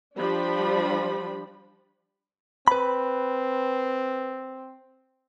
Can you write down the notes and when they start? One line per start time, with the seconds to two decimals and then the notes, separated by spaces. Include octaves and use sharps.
0.18 F3 G3 D4 B5
2.68 C4 B4 B5